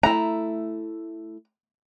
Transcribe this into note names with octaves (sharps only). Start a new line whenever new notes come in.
A3 E4 A#5